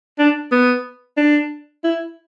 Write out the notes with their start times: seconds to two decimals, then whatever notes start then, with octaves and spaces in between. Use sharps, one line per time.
0.19 D4
0.52 B3
1.18 D4
1.84 E4